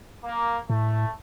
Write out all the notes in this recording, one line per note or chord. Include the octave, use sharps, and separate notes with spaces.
A#3
A2 A3